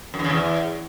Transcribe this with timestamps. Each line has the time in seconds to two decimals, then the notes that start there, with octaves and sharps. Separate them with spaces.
0.14 F#2
0.19 E2
0.24 C#3
0.30 E2